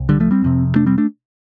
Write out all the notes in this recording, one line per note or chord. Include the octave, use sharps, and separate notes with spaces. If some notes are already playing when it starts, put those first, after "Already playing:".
Already playing: C2
D3 G3
F3 A3
G3 C4
F1 F2 C3
A3 D4
G3 C4
A3 D4